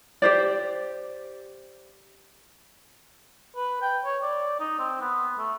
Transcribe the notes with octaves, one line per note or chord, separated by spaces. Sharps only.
G4 C5 D5
B4
G5
C#5
D5
D#4
C4
B3
A3